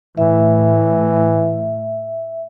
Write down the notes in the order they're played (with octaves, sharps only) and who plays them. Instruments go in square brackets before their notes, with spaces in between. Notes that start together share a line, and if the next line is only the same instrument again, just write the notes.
[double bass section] A2 [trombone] E3 [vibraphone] E5